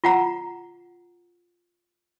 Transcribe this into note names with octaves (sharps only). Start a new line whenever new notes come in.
F4 F#5 A#5